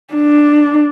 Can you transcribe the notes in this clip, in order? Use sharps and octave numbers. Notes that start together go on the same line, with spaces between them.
D4